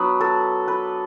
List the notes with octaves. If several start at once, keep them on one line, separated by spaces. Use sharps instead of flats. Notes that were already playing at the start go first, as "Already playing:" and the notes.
Already playing: F#3 B3 D4 B4
A4
B4